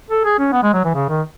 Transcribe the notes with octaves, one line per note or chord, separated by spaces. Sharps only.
A4
G#4
C#4
B3
G#3
F#3
E3
C#3
D#3